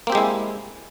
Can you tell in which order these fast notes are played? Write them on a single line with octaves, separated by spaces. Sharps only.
A#3 C4 G4 G#3 E4